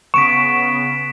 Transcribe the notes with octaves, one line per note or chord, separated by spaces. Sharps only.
C#3 B3 C#6 B6 D7 E7